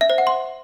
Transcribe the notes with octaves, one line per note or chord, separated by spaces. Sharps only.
E5
C5
F#5
C6